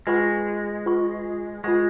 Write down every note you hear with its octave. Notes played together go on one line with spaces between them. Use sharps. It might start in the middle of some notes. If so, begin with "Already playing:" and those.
G#3 F4 B4 F#5 C#6
F4 B4 F#5 C#6
G#3 F4 B4 F#5 C#6